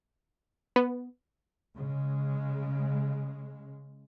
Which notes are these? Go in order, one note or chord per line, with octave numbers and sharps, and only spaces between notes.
B3
C#3 G#3